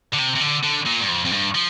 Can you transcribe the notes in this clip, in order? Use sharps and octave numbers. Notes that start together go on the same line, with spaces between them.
D3
C3
C3
D3
D3
A#2
G2
F2
F2
G2
F3